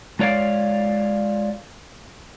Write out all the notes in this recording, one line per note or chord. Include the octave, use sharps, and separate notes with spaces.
G#3 F4 C#5 D5 F5